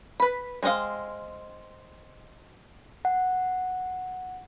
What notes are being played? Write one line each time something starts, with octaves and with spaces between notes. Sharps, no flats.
B4 B5
G#3 C4 C#4 D#5 F5
F#5